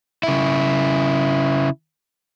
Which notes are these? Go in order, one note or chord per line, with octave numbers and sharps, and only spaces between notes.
C#3 E4